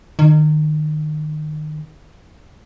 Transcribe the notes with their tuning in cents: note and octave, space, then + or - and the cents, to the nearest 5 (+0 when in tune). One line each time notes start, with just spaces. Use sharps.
D#3 -30